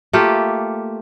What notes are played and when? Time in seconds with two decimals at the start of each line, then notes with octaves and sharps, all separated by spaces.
0.13 A3 A#3 F4 G4